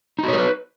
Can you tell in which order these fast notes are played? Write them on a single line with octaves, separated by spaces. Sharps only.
D#4 F#4 C#5 A#4 B4